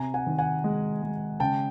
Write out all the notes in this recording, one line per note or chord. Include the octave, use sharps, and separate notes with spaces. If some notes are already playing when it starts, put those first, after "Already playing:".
Already playing: C3 G#5 A#5
F#5 G#5
D#3
F#5 G#5
G#3
G#3
C#3 G5 A5